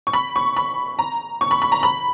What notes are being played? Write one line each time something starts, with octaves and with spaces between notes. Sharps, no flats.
C#6
B5
C#6
B5
A#5
C#6
B5
B5
A#5
B5